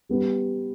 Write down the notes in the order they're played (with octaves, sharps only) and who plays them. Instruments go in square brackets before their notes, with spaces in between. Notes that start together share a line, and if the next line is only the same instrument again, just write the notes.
[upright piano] G3 B3 G4